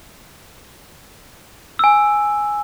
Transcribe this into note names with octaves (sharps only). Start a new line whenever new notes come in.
G#5 E6